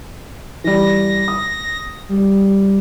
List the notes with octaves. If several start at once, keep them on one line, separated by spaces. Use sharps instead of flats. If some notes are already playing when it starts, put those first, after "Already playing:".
E3 G3 A#6
D#6
G3